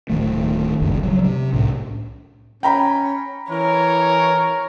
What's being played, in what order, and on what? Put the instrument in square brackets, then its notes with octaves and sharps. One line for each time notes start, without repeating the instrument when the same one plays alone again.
[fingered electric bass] D1 E2 D#3 A3
F#1 C#2 G2
F#3 G3
C3
C2 A2
[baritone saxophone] C#4 [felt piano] G5 A#5 B5
[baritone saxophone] E3 [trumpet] A#4 [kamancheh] C#5